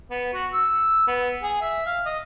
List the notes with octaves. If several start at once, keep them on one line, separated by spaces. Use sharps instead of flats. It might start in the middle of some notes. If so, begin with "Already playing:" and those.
B3
F#4
E6
B3
G#4
E5
F5
D#5